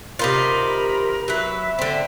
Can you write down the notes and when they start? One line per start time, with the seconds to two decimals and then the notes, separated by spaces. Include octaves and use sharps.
0.19 C3 D#4 F4 A#4 B5
1.28 F#3 B4 E5
1.79 D3 C4